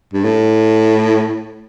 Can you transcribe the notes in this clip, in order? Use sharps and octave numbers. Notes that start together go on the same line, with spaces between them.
G2
A2